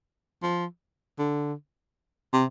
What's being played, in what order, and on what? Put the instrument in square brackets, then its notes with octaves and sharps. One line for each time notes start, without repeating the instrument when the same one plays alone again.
[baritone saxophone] F3
D3
C3